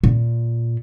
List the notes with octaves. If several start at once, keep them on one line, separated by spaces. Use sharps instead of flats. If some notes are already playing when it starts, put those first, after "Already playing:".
A#2